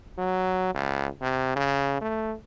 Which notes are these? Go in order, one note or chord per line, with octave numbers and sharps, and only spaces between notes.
F#3
C#2
C3
C#3
A3